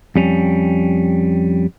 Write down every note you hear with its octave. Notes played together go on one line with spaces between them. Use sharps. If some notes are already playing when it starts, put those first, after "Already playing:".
F2 G3 C#4